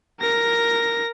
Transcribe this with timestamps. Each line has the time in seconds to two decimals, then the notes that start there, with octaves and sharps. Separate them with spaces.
0.20 A#4 A#6